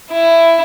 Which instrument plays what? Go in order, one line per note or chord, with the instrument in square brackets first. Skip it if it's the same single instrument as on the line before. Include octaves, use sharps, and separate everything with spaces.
[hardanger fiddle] E4